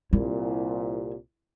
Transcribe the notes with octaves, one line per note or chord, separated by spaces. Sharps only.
C2 A#2 E4